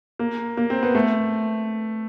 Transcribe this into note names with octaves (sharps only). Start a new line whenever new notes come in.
A#3
A#3
C4
B3
A3